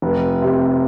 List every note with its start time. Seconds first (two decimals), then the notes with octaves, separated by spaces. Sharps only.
0.02 F1
0.42 C3